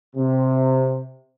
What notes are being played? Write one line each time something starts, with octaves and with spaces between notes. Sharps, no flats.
C3